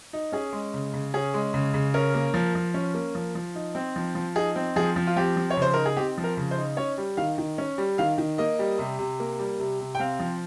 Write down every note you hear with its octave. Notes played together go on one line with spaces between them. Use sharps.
D#4
C#4 G#4
G#3
C#3
C#3
C#4 G#4
G#3
C#3
C#3
C#4 A#4
A#3
F3
F3
C#4
A#3
F3
F3
D#4
C4
F3
F3
D#4 G#4
C4
F3 G#4
F3
F4
C4 G4
F3
C#5
C#3 C5
D#4 A#4
G#4
C4 G4
F3
A#4
C#3
C5
D#4
C#4 C#5
G3
D#3 F5
D#3
C#4
G3
D#3 F5
D#3
A#3 D#5
G3
C3
C3
A#3
G3
C3
C3
G5
C4 F5
F3